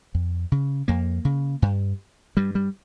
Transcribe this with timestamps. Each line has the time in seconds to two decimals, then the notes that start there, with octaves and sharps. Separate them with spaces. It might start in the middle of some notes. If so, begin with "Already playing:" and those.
0.15 F2
0.52 C#3
0.88 F2 A#3
1.25 C#3
1.62 G2
2.37 G2 G3
2.55 G3